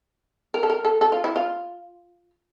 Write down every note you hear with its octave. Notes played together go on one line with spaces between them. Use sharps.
A#4
A4
A#4
A4
A4
F4
E4
F4